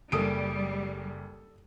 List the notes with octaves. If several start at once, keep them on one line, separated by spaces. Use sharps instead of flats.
F#1 G3 A4 D#6 D7